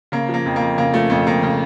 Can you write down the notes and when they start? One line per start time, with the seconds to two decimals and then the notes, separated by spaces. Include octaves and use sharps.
0.12 C#3 A#3
0.29 F3
0.34 A#3
0.46 F2
0.56 A#3
0.61 F2
0.78 C#3 A#3
0.94 F3 A3
1.10 F2 A3
1.27 F2 A#3
1.43 C#3